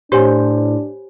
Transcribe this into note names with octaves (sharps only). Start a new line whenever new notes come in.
A2 D4 G4 C5 C#5 G#5